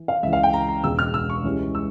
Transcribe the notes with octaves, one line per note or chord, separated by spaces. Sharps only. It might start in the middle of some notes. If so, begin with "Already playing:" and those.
Already playing: E3
F5
C#2 C#3 E3 E5
F5
G5
A#5
A#5
E1 E2 C#3 E6
F6
E6
C#6
C#2 C#3 E3 G3 C#4
E6